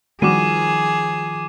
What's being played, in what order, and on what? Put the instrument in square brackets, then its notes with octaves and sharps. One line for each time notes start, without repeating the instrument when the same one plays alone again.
[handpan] D#3 F3 [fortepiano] G3 F#4 [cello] G#4 [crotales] D6 D#7